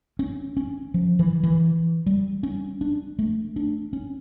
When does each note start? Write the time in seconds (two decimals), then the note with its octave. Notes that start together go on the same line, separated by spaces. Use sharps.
0.19 C#4
0.57 C#4
0.94 F3
1.19 E3
1.43 E3
2.06 G3
2.43 C#4
2.81 D4
3.19 A3
3.56 D4
3.93 C#4